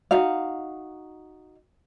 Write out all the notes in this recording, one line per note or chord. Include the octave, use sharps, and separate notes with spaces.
D#4 F#4 F5